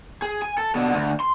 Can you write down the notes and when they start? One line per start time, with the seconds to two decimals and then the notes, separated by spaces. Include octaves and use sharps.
0.22 G#4
0.42 G#5
0.58 A4
0.75 B2 D3
0.94 D2
1.20 C6